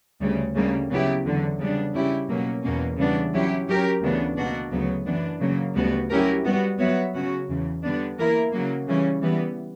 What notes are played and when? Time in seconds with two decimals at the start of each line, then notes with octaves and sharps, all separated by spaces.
0.21 D2 C#3 G3
0.56 D2 C#3 G3 A#3
0.90 C#3 F#3 B3 E4 G4
1.25 E2 D3 F#3
1.59 C#3 G3 B3 D4
1.95 C#3 G3 C#4 E4 G4
2.29 B2 F#3 A#3 C#4
2.64 E2 B2 A#3 C#4
2.98 C#3 E3 G3 B3 D4
3.33 F#3 C#4 E4 G4
3.68 F#3 C#4 G4 A#4
4.02 D2 C#3 E3 B3 D4
4.37 B2 A#3 D4 F#4
4.71 D2 C#3 F#3 B3
5.06 F#2 E3 B3 D4
5.41 C#3 F#3 A#3
5.76 D2 C#3 G3 B3 F#4
6.10 F#3 C#4 E4 G4 A#4
6.45 G3 B3 F#4
6.79 F#3 B3 F#4 C#5 E5
7.14 C#3 F#3 C#4 F#4
7.49 E2 C#3 E3
7.84 D3 G3 B3 D4
8.18 E3 A#3 E4 A#4
8.53 C#3 F#3 A#3
8.87 C#3 E3 G3 C#4
9.22 E3 G3 B3